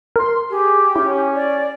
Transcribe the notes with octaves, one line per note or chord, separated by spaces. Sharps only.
A#4 C6
G4 G#4
C#4 E4
D5